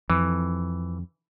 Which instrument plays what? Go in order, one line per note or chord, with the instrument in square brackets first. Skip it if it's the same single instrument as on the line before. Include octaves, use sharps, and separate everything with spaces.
[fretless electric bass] F2 [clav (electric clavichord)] E3